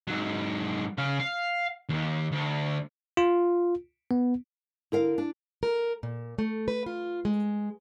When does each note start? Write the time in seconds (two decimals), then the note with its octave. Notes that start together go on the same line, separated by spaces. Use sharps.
0.07 G#2 F#3
0.98 C#3 F5
1.20 F5
1.89 D#2
2.32 D2
3.17 F4
4.11 B3
4.92 D3 E4 A#4 F5
5.18 D4
5.63 A#4
6.03 A#2
6.38 A3
6.68 B4
6.86 F4
7.25 G#3